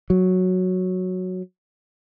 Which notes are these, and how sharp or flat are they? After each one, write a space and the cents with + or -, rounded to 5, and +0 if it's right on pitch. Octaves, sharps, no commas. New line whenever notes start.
F#3 -5